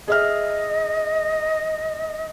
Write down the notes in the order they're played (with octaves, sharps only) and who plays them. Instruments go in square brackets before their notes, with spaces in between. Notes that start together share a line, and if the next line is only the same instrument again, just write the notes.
[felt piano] G#4 E5 F6 [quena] D#5